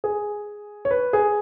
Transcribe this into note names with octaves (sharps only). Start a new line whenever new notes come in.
G#4
C#5
B4
G#4